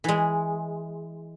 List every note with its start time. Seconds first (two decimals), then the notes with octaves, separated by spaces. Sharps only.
0.04 E3 G#3